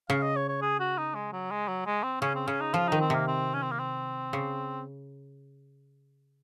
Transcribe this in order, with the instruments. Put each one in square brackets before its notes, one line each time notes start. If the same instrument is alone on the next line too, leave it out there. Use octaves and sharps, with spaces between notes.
[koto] C#3 [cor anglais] F5
[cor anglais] D#5
C#5
C#5
G#4
F#4
D#4
G#3
F#3
G#3
F#3
G#3
C4
[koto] C#3 [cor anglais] C#4
[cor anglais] C4
[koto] C#3 [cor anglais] C#4
[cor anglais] D#4
[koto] F3 [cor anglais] F4
[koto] D#3 [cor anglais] D#4
[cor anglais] C4
[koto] C3 [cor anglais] A#3
[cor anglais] C4
C#4
C4
A#3
C4
[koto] C#3